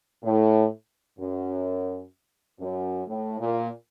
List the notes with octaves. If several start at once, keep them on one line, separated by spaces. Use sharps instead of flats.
A2
F#2
F#2
A2
A#2